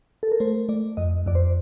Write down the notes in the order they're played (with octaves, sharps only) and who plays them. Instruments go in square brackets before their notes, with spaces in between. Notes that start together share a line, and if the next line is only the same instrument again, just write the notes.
[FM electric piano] A4
A#4
A3 C5
A3 D5
F2 D#5
F2 D5
C5